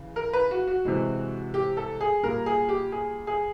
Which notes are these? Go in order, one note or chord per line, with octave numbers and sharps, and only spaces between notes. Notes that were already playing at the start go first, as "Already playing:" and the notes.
Already playing: C#3 E3
A#4
B4
F#4
F#4
C3 E3 G#3
G4
A4
G#4
A#2 G3 A#4
G#4
G4
G#4
G#4